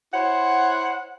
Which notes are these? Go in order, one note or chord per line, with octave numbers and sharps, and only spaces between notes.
E4 C5 C#5 F#5